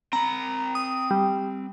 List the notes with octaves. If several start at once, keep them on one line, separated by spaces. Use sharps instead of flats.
C4 A#5 B5
D#6
G3